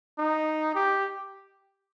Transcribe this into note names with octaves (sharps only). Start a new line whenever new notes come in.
D#4
G4